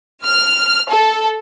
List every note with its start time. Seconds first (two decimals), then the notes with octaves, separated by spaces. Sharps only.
0.24 F6
0.90 A4